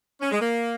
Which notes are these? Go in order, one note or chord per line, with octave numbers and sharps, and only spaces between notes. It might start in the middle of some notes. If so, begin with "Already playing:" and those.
C#4
G#3
A#3